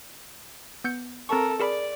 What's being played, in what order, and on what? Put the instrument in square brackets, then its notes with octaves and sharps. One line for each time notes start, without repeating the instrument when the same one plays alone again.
[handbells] B3 G6 C#7
[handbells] C4 C#6 [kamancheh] A4 A#4
[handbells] G#4 A#4 B5 [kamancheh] D5